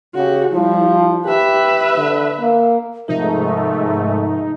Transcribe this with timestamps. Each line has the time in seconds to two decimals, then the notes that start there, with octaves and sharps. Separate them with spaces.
0.15 C#3 F#4 G4
0.53 F3 G3 E4
1.26 G4 B4 E5
1.98 D3
2.40 A#3
3.08 G#2 C3 F3 A3 D#4 A#4 E5